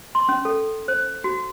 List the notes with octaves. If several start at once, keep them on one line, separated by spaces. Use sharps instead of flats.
C6
C#4
A4
C5
F#4